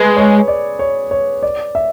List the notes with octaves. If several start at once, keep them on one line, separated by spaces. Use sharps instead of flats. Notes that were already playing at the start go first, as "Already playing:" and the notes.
Already playing: G#3 G#4 B4
C#5
D5
C#5
C#5
D5
E5